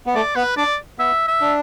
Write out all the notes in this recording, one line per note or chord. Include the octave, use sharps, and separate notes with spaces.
B3
A3 D5
B3 B4
D4 D5
B3 E5
E5
D4